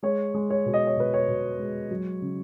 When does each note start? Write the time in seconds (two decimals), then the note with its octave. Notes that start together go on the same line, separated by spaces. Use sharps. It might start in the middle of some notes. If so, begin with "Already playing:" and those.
0.03 G#3 C#5
0.34 G#3
0.50 C#5
0.66 B2
0.73 D#5
0.87 C#5
0.96 B2 B4
1.14 C#5
1.28 B2
1.59 G#3
1.91 F#3
2.22 C#3